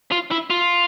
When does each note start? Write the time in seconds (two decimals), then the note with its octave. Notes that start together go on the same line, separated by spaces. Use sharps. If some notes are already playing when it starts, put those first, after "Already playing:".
0.12 F4
0.31 E4
0.50 F4